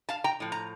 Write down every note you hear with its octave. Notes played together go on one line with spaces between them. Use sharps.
F5 A5
G5 A#5
A2 F3
A#5